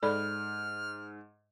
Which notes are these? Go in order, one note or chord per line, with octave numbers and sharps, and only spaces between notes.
G#2 A4 D5 B5 F6